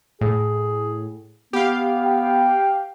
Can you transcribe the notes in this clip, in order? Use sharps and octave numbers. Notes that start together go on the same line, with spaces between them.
A2 G#4
B3 G4 F5
G5